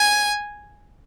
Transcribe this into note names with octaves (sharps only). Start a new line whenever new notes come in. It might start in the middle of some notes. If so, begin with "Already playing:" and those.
Already playing: G#5